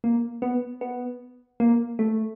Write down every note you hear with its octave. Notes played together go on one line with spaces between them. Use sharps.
A#3
B3
B3
A#3
A3